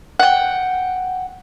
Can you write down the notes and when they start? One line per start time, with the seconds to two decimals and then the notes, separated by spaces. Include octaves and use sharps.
0.20 F#5 G5